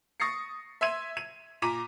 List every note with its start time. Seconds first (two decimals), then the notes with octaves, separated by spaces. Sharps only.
0.20 C#6 D#6 A6 A#6 C7 C#7
0.81 E5 C6 E6 G#6 D#7
1.17 D#7
1.62 A#2 A#5 D6 B6 D#7